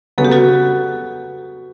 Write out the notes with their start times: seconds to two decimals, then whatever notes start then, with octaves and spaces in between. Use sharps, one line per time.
0.18 C#3 F#3 B3 A4
0.25 G4
0.32 F#4 A4